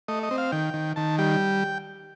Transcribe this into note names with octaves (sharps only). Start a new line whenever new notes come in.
A3 D#5
D#5
C4
F5
D#3 G5
D#3
D#3 A5
G3 G5